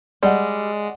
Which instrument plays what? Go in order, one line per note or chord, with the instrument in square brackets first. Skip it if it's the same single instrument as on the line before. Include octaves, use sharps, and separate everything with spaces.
[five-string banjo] G3 [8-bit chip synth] G#3 [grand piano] D5 D#5 F#5